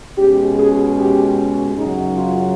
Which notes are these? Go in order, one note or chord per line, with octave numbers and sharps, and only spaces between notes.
B2 G#3 C#4 G4
G#4
G4
F#2 C#3 F#3 D#4
F4